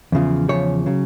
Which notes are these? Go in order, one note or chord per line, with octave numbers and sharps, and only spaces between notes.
E2 C#3 F3
E2 C#3 F3 C#5
C#3 F#3